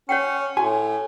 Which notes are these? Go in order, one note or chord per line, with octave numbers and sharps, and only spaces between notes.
C#4 C#5 F#5 G5
A2 F#4 G#5